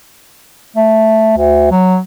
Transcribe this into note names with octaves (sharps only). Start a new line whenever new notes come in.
A3
D2
F#3